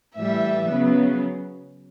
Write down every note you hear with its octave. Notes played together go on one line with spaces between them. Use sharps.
A2 E3 G3 E5
C#3 F#3 B3